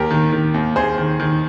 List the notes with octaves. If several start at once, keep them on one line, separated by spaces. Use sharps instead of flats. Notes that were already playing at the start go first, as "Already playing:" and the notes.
Already playing: D#2 G4 A#4
D#3
D#3
D#2
D#2 G#4 C5
D#3
D#3